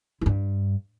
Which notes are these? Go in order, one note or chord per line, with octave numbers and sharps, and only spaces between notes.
G2 E4